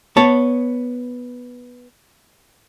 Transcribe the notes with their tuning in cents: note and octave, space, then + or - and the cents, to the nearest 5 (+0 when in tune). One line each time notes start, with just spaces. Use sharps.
B3 -5 C#5 +0 A5 +0